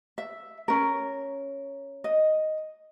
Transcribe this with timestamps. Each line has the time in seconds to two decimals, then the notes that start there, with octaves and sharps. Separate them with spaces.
0.18 E5
0.68 C#4 A#4
2.04 D#5